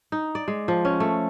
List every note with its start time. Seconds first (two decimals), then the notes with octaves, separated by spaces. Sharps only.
0.12 D#4
0.35 D5
0.48 G#3
0.68 F3
0.85 C#4
1.00 A3